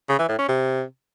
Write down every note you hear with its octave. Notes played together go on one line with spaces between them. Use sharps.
C#3
E3
A2
C#4
C3